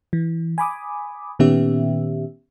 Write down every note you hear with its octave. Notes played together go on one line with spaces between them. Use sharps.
E3
G#5 B5 D6 D#6
A#2 D#3 B3 C#4 G4 E5